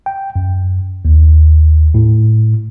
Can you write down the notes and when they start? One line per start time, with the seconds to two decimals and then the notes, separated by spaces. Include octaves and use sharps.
0.06 G5
0.36 F#2
1.05 D#2
1.94 A2